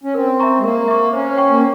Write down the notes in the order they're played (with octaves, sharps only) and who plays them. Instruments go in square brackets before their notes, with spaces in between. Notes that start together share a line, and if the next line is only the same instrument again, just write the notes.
[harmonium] C#4
[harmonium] C4 [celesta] A#4
[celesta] E5 A#5 C#6
[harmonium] G#3
[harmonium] A#3 [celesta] A#4
[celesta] E5 A#5 C#6
[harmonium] C#4 [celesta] C5
[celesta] G5 C#6
[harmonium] A#3